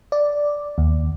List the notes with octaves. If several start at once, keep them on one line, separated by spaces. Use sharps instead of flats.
D5
D#2